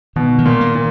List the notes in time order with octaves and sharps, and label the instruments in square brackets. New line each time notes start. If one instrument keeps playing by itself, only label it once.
[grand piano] B2 [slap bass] D#3
[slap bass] D#3
[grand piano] A#2
[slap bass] A#3
[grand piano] A#2